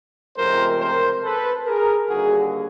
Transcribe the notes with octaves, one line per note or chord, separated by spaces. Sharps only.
C#2 C3 F3 A3 C4 A#4 C5
A#4 C5
A4 B4
G#4 A#4
D#2 D3 G3 A#3 F#4 G#4